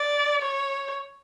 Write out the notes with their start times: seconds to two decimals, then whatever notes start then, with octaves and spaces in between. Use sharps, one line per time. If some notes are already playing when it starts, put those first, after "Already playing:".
Already playing: D5
0.42 C#5